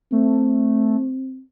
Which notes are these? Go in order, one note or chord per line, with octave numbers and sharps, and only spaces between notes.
A3 C4